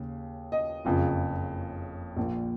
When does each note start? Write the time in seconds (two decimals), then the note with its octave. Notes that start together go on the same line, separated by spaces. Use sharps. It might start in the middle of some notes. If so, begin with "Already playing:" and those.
Already playing: D#2 C#3
0.52 D#5
0.85 F#1 F2 C#3 F3
2.16 A#1 A#2 F3